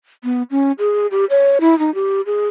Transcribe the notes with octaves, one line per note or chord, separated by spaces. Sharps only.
B3
C#4
G#4
G4
C#5
E4
D#4
G4
G#4